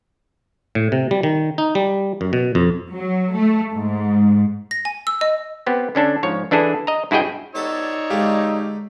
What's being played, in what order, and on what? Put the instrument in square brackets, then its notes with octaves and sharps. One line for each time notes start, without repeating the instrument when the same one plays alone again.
[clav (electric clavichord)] A2
C3
G3
D#3
D#4
G3
F#2
B2
F2
[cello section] F#3
A3
G#2
[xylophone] A#6
G#5
E6
D#5
[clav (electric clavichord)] B3 C4 G4
D3 C#4 D4 A4
G#2 F3 C#5
E3 D4 E4 G#4 A4
D#5 A#5
G2 E4 F#4 G#4 D#5 G5
[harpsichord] B3 G4 A4 [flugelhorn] D#4 [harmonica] C#5 D5 E6
[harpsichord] D3 G#3 [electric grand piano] G4 F5